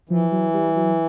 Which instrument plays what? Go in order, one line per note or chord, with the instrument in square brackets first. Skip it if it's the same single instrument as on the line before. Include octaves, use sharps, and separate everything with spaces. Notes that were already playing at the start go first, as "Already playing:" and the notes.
[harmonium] E3 [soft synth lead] F3
[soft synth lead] F#3
G3
F#3